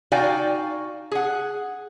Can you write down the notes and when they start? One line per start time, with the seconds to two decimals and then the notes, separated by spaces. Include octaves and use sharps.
0.12 D#4 F#4 D5 F5 G5 G#5
1.12 G#4 F#5